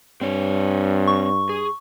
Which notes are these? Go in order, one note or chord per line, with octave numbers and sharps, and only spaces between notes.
G2 C4 C#5
C#6
G#4